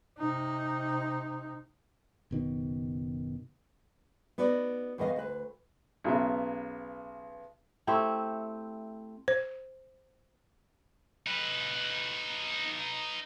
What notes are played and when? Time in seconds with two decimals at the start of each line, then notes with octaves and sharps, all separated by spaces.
0.19 C3 D#4
2.31 F#1 B2 D#3
4.38 B3 D#4 F#4 D5
4.98 E2 D#3 B3 D#5 F5
5.16 D2 B4
6.04 B1 C#3 F#3 B3 E5
7.87 A3 C4 E4 G4
9.28 C5
11.27 D#4 B4